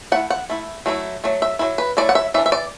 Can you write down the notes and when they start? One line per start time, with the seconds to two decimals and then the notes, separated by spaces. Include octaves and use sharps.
0.12 A3 E4 F#5
0.30 F#5
0.50 A3 E4
0.86 F#3 A3 E4
1.24 F#3 A3
1.42 E5
1.59 F#3 A3 E4
1.78 B4
1.97 F#3 A3 E4 D5
2.09 F#5
2.15 E5
2.34 E3 E5
2.38 D4
2.46 E5
2.52 D5